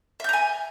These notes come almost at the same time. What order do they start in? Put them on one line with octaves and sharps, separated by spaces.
E5 G6 A#5 G#5